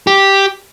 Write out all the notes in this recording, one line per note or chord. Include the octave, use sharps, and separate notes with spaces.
G4